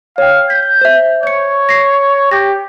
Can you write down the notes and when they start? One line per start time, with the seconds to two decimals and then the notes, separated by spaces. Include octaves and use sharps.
0.18 C#5 F5 G5
0.50 G6 B6
0.81 C5 E5
1.23 C#5 G6 C#7
1.69 A#6 C7
2.31 G4 G6 A#6